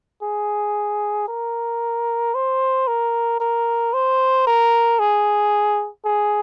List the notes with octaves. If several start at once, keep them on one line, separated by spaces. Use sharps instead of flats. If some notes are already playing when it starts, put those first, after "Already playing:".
G#4
A#4
C5
A#4
A#4
C5
A#4
G#4
G#4